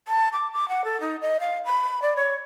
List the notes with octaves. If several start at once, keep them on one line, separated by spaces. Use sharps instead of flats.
A5
D6
D6
F#5
A4
D#4
D#5
F5
B5
D5
C#5